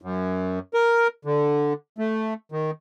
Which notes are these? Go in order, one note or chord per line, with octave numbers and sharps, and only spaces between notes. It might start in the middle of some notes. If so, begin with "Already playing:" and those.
F#2
A#4
D3
A3
D#3